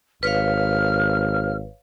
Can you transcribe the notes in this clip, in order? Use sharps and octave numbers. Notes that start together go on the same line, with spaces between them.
G#1 B4 C#5 F5 F6